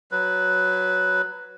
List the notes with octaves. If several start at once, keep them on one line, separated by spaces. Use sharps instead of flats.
F#3 B4